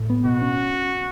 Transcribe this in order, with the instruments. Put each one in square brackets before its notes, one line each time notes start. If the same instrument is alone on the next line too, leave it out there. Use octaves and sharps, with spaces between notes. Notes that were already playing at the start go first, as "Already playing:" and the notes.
Already playing: [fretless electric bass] A2
B3
[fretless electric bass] B2 [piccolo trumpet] F#4
[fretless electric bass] C#4